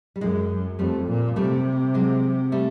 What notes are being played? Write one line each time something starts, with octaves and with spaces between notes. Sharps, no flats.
G3
F#2 F#3 G#3
F2 G3 A3
A#2
C3 G3 A3
F#3 G#3
G3 A3